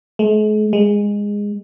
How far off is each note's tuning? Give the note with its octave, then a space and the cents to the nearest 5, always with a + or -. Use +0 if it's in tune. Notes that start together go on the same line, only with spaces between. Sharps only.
G#3 +45
G#3 -15